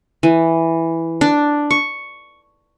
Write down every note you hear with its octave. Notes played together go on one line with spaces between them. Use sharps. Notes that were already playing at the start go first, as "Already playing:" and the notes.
E3
D4
C#6